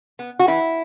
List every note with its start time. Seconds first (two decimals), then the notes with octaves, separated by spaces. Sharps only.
0.19 B3
0.39 F#4
0.48 E3 E4